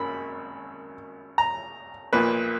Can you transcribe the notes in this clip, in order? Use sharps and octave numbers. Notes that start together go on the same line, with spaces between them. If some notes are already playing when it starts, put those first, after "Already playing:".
Already playing: G#1 F#2 A#3 B5
A#5
B1 A#2 F3 A#3 B4